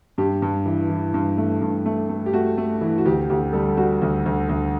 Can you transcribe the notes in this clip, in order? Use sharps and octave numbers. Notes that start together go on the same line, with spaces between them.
G2 G4
G2
E3
E3
G2
A3
G2
A3
A3
G4
A3 F#4
A3
E3
F#4
D2 G4
D2 G4
G3 A4
G3 F#4
D2
D2
D2